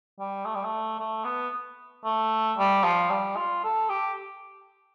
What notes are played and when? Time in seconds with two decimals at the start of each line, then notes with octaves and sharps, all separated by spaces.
0.19 G3
0.45 A3
0.55 G3
0.64 A3
0.99 A3
1.25 B3
2.05 A3
2.58 G3
2.84 F3
3.10 G3
3.36 F4
3.64 A4
3.89 G4